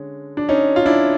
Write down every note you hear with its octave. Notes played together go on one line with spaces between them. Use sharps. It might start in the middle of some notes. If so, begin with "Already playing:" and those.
Already playing: D3 G#3 C#4
D4
C#4 D#4
F4
D4 E4